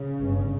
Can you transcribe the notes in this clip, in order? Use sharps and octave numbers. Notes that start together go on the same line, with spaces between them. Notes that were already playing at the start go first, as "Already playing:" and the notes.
Already playing: C#3
G1 G2